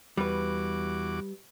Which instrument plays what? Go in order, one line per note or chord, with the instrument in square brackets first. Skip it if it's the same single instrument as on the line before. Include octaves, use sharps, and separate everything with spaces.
[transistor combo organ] E2 F#4 D6 [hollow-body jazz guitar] G3 B4